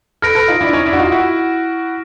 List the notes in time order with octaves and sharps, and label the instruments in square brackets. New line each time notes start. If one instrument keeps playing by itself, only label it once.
[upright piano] A4 B4 [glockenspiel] F6 A#6 D7
[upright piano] A4 B4
D#4 F4
D4 E4
C#4 D#4
D4 E4
F#4
D#4 F4
E4 F#4